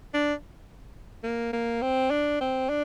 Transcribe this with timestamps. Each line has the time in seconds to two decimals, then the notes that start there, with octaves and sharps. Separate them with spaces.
0.14 D4
1.23 A#3
1.53 A#3
1.82 C4
2.10 D4
2.40 C4
2.69 D4